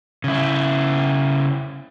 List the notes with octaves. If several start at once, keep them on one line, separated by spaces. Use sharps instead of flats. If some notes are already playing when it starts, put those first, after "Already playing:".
C#3 E4